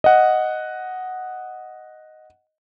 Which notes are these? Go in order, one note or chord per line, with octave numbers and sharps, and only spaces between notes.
D#5 F#5